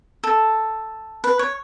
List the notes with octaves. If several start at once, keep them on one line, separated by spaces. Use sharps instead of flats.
A4
B4
C#5